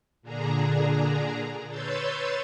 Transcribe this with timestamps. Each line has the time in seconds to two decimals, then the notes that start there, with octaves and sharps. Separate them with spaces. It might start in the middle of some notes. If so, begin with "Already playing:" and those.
0.22 A#2 D3 D4 G#4 A#5
1.68 B4 C#5 C6 E6 G6 A6